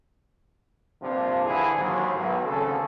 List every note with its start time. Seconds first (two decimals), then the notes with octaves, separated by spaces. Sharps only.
1.01 A#1 G2 C3 F3 D4 F4
1.45 D3 E3 E4 G#4
1.77 D#2 G#2 F#3
2.16 B1
2.45 G#1 D2 C#3 A4